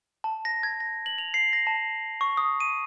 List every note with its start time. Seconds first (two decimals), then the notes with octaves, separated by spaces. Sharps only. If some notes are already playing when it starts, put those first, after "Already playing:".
0.24 A5
0.45 A#6
0.63 G#6
0.80 A#6
1.06 F#7
1.18 F7
1.34 C7
1.53 A#6
1.67 A5
2.21 C#6
2.37 D#6
2.60 D#7